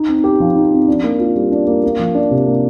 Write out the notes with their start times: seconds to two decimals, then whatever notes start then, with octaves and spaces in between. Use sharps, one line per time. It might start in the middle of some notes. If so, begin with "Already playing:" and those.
Already playing: D#4
0.08 C4
0.24 G4
0.40 F3
0.56 D#4
0.72 C4
0.88 D4
1.04 A#3
1.20 F4
1.36 G3
1.51 D4
1.67 A#3
1.83 A#3
1.99 F3
2.15 D4
2.31 C3
2.47 A#3